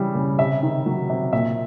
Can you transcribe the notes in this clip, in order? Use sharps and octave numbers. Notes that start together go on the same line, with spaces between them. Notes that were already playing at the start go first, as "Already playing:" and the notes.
Already playing: C#3 E3 G3
C#3
C3 E5
D#3
F#3
C3
A#2 E5